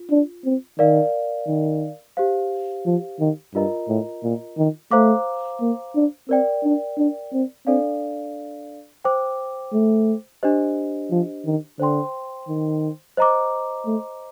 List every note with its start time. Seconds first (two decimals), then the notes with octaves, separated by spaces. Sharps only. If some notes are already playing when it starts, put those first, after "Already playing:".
Already playing: F4
0.11 D4
0.45 C4
0.79 D#3 A#4 D5 F5
1.48 D#3
2.17 G4 C5 F5
2.86 F3
3.20 D#3
3.54 G2 F4 A#4 D#5 A#5
3.89 A2
4.23 A#2
4.58 D#3
4.91 A3 C5 F5 A#5 D6
5.61 A#3
5.95 D4
6.29 C4 A#4 D5 G5
6.64 D4
6.98 D4
7.33 C4
7.67 C4 D4 A4 D5 F5
9.05 C5 G5 D6
9.73 A3
10.43 D4 G4 C5 D#5
11.11 F3
11.46 D#3
11.80 D3 C5 G5 C6
12.48 D#3
13.17 C5 D#5 A#5 D6
13.86 A3